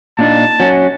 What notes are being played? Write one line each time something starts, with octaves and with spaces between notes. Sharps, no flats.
A#2 D4 D#4 A5
F#3 C#4